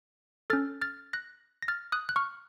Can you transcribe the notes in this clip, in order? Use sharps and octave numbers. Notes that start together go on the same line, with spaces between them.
C#4 A4 F6 A6
F6 A6
F#6 A#6
A#6
F6 A6
D#6 F#6
F#6
C#6 F6